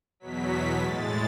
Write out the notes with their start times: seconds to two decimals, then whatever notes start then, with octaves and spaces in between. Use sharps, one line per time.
0.20 E2 B2 F#3 B6
0.80 A2 G#3 A6